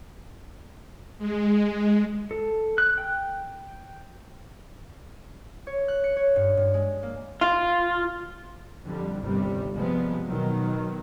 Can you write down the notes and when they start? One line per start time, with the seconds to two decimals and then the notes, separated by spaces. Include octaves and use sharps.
1.19 G#3
2.31 A4
2.78 F#6
2.98 G5
5.67 C#5
5.88 F#6
6.04 C#7
6.16 C#5
6.36 G2
6.57 G2
6.74 G#3
7.03 A#3
7.41 F4
8.85 F2 D3 G3
9.20 G1 D#2 C3 G3
9.75 C3 F3 G3 G#3 B3
10.25 B2 D#3 F#3